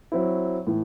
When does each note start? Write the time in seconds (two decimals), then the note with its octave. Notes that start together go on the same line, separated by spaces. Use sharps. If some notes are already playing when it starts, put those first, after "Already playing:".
0.12 F#3 C4 E4
0.67 A2 E3